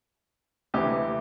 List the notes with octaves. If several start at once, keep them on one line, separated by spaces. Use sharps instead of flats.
D2 C3 E3 G4